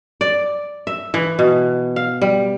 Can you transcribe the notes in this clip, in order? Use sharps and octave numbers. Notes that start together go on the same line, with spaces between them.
D5
E5
E3
B2
F5
G3